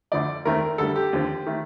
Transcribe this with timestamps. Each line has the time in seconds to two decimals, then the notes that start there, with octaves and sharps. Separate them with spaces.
0.12 D2 D3 F3 A3 D5
0.45 D#2 D#3 A3 C4 A#4
0.78 D2 D3 G3 A4
0.96 G4
1.13 D#2 D3 F3 C4
1.46 D#3 A3